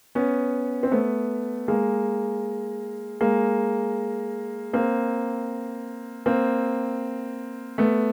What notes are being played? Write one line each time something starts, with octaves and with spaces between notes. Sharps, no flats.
B3 C#4
C4
A3 B3
G#3 A#3
G#3 A#3
A#3 C4
A#3 C4
A3 B3